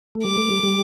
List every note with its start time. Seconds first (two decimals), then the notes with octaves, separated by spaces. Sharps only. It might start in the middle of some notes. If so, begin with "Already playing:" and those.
0.15 A3
0.24 G3 D6
0.37 A3
0.50 G3
0.63 G3